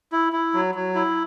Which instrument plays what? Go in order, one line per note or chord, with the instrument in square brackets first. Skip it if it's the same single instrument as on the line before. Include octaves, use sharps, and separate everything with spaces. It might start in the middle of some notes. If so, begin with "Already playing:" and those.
[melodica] E4
E4
F#3
F#3
E4